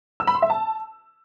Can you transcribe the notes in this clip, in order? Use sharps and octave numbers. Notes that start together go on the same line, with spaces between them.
E6
B5
C6
E5
A5